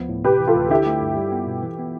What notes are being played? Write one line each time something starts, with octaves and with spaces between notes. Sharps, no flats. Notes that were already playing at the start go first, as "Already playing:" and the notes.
Already playing: D2 F3 B3
A2
C3 G4 B4
E3
F4 A4
D2
D3 E4 G4
A3
G2
G3
B3
B2
E3
B3